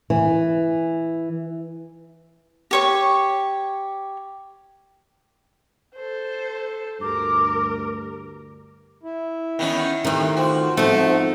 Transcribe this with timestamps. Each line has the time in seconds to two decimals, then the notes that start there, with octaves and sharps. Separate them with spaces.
0.10 E3
2.71 G4 C#5 C#6
5.95 A4 C5
7.01 D2 G2 A#4 D6
9.03 E4
9.59 D#3 B3 C#4
10.05 C3 D#3 A3
10.37 F4 F#4 C5
10.77 G#2 F3 A3 C4 D#4